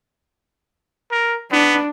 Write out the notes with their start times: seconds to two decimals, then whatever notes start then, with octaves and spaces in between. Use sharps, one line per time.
1.11 A#4
1.52 B3 D4